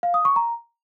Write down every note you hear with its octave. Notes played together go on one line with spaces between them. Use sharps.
F5
D#6
C#6
A#5